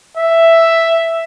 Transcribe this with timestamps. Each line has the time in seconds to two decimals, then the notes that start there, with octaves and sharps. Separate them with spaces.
0.17 E5